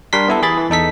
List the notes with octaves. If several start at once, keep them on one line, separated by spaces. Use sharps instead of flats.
G3 D4 A#4 C6 B6
B3 E4 A4
E3 G#4 B5 A6
E3
E2 D#4 A4 B6